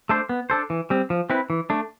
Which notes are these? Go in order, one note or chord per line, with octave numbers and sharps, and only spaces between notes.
A3 D4 A4 C5
B3
D4 A4 C5
E3
G3 C4
F3
C4 E4 B4
E3
A3 D4